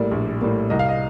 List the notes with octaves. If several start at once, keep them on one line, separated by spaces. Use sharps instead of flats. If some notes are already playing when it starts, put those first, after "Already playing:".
Already playing: A#1 A2 G3 A#3 D5
A#1
A2 G3 A#3
C2 D#5
F5
D#5